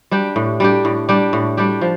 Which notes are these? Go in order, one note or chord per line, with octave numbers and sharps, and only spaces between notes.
G3 D4 G4
A2
G3 D4 G4
A2
G3 D4 G4
A2
G3 D4 G4
F3